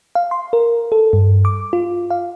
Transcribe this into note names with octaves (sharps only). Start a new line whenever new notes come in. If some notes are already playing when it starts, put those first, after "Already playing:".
F5
C6
A#4
A4
G2
D6
F4
F5